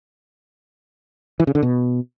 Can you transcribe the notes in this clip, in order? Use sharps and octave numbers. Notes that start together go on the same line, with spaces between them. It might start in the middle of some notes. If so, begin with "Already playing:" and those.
E3
C#3
D3
B2